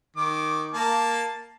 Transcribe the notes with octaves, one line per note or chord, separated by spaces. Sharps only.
D#3 D6
A#3 A5